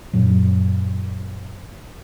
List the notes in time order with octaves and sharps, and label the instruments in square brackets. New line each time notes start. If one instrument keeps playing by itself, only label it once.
[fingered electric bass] F#2 A#2 F#3